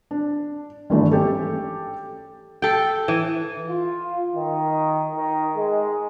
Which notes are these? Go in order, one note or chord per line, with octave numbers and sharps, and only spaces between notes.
D4
G#1 G2 E3 F#3 A3
C#4 G4 A4
A4 G5
E3
F4
D#3
D#3
G#3